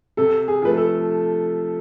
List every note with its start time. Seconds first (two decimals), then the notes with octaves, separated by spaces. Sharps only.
0.17 C3 A4
0.48 G#4
0.62 F3 A3 B4
0.77 A4